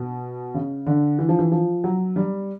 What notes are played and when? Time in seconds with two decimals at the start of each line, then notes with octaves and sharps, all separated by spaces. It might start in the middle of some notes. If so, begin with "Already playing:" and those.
Already playing: B2
0.54 C#3
0.86 D3
1.19 E3
1.29 F3
1.39 E3
1.52 F3
1.84 F#3
2.16 G3